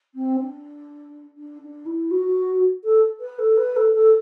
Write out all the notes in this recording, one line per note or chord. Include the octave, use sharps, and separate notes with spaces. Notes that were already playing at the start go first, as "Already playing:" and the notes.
C4
D4
D4
D4
E4
F#4
A4
B4
A4
B4
A4
A4